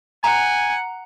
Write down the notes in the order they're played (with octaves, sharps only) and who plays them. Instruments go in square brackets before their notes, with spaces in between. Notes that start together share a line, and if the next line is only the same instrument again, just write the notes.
[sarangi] F#5 [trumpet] G#5 [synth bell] A#5